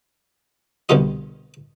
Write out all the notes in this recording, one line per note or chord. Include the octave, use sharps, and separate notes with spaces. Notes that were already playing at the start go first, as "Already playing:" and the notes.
C2 B2 D3 G3 F4 D#5